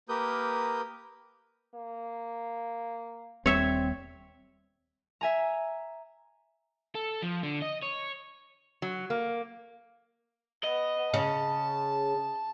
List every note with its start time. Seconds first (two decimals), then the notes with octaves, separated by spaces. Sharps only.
0.09 A#3 G4 A#4 B4 D#6 G6
1.75 A#3
3.46 D#1 D#2 D3 G3 C4 C#5 E5
5.21 E5 G#5 A#5
6.95 A4
7.22 F3
7.43 D3
7.62 D#5
7.82 C#5
8.82 F#3
9.10 A#3
10.64 B3 D#5
11.14 C#3 A5